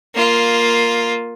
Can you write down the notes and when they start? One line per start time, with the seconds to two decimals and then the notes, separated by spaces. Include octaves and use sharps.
0.15 A#3 F4